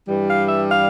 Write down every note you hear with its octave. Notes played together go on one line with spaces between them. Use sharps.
G2 E3 G3
F5
E5
F5